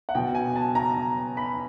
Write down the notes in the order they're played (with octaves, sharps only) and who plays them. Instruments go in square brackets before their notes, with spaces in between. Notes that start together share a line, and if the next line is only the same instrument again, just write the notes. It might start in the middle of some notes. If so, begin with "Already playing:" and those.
[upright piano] F#5
B2 G5
G#5
A5
A#5
B5